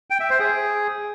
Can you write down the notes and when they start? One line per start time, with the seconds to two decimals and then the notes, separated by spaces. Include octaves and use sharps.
0.10 G5
0.20 E5
0.30 C5
0.40 G#4